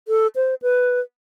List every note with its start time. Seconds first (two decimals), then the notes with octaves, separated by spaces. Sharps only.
0.08 A4
0.36 C5
0.62 B4